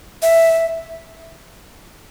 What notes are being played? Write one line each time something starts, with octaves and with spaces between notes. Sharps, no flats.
E5